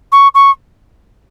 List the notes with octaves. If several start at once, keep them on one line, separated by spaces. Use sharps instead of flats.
C#6
C#6